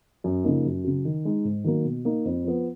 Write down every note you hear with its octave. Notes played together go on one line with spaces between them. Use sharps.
F#2
C#3 F3 A#3 D#4
F#2
C#3 F#3
D#3
G#3 D#4
G#2
D#3 F#3 A#3
B2
A#3 D#4
F2
F3 B3